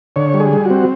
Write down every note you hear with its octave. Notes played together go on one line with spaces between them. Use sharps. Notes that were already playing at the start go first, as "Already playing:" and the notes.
D3 C#5
G3
G#4
G3
C4 F#4